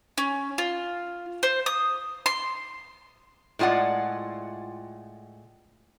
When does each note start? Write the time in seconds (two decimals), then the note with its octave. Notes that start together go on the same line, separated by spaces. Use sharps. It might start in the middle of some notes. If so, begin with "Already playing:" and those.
0.18 C#4
0.58 F4
1.43 C5
1.66 D#6
2.26 C6
3.59 A2 G#3 F4 D5 F#5